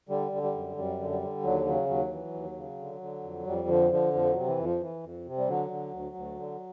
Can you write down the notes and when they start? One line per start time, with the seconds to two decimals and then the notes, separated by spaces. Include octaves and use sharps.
0.09 D3 G3
0.32 D3
0.43 G3
0.54 F#2
0.77 F#2 G3
0.99 D3
1.10 G3
1.22 D3
1.44 D#2 F#3
1.66 C#3 F#3
1.89 D#2 F#3
2.11 E3
2.34 D#2
2.56 C#3
2.79 D3
3.01 D3
3.23 F2
3.46 F2 G3
3.68 D3 F3
3.91 D3 F3
4.13 F2 F3
4.30 F#3
4.36 C3
4.47 E3
4.58 F2
4.64 F3
4.81 E3
5.03 F2
5.26 C3
5.38 G3
5.48 D3 F#3
5.71 D3
5.93 D2
6.16 D2
6.38 D3